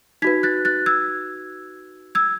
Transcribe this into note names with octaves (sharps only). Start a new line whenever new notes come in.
D#4 F#4 B4 G#6 B6
F#6 A6
F#6 A6
E6 G#6
E6 G#6